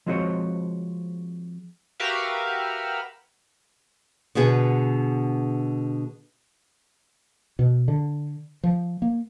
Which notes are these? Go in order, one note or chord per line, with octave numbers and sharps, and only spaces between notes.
F3 G#3 C4 F#4 C5 C#5
F#4 G4 A#4 B4 E5 F5
B2 D3 B3 G#4
B2
D3
F3
A#3